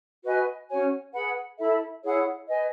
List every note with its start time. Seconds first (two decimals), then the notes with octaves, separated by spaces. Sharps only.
0.23 F#4 B4 D#5 G#5
0.68 C#4 F#4 C#5 G#5
1.13 G#4 B4 F#5 B5
1.58 E4 A4 E5 B5
2.03 E4 G#4 C#5 F#5
2.48 B4 D#5 G#5